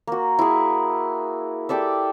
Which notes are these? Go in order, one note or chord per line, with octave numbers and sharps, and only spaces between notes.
A#3 F#4
E4 G#4
G4 A4 D5 E5